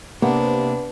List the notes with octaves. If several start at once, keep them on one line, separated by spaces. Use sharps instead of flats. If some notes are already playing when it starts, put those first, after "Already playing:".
C3 A#3 B3 D4